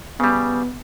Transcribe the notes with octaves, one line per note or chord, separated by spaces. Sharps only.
C#3 G3 B3